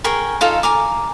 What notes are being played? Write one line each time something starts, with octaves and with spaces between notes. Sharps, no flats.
G#4 A#4 G5 C#6
D#4 F4 A4 F5
G#5 A#5 D6